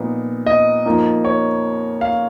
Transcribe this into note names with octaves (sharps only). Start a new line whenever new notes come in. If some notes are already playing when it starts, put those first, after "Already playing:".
Already playing: A#2 F3 B3 D#4
D#5
F2 F3 A#3 D#4
C#5
F5